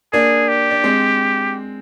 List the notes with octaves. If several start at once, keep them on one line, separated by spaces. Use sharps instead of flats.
A#3 D4 G#4
G4
D4
G#3 C4